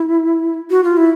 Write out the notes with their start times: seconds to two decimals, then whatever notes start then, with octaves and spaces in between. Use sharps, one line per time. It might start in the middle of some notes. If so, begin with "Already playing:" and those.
Already playing: E4
0.70 F#4
0.84 F4
0.97 E4